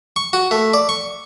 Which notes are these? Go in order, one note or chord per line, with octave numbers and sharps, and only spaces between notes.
C#6
F#4
A3
D5
C#6